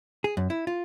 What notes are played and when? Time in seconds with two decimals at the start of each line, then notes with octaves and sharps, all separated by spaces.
0.24 G#4
0.37 F#2
0.50 E4
0.67 F4